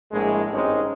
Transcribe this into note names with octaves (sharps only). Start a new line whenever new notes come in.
A#1 A2 G#3
G#1 G2 G#3 C4 C#4 D#4